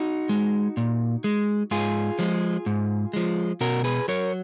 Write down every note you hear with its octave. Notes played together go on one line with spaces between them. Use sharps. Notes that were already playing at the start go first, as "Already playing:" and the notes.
Already playing: D#4 F#4
G#3
A#2
G#3
G#2 F4 G#4
F3 G#3
G#2
F3 G#3
B2 F#4 A#4
G#4 B4
F#3 A#4 C#5